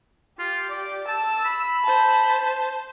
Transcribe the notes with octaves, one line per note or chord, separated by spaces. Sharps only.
F4 G4
D5
A5 E6
B5
C5 A5